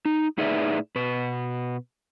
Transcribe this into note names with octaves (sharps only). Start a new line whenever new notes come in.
D#4
A2 D#4 G#4 B4 D5 E5
B2 B4